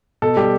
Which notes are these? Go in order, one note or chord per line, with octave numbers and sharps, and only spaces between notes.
B2 A4
G3 G4